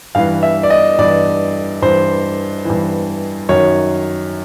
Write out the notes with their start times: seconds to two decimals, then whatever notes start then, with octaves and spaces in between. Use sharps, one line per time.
0.15 G2 E3 F5
0.43 E5
0.63 D5
0.70 D#5
0.99 G2 E3 D5
1.82 G2 E3 C5
2.65 G2 E3
3.49 F#2 D#3 C#5